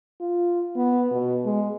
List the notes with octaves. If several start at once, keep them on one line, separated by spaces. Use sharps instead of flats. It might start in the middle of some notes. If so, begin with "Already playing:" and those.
F4
B3
B2
G#3